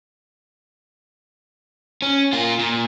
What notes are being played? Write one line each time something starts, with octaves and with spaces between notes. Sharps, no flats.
C#4
A#3 F4
A#2